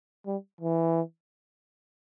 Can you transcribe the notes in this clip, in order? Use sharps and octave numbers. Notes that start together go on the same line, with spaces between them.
G3
E3